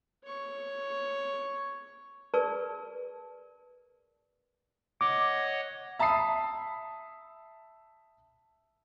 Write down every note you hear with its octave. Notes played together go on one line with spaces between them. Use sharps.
C#5 C#6
G#4 A#4 B4 D5 A5 C#6
C#5 D#5 F#5 D6
E5 A5 B5 D#6 C7